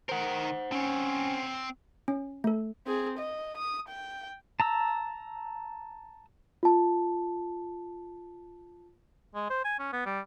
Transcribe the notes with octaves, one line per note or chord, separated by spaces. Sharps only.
D#3 A#4 C5 F#5
C4 C#4 C#5
C#4
A3 A4
C4 G#4
D#5
D#6
G5
A5 A#5 E6
F4 A5
G#3
C5
G#5
C#4
B3
G3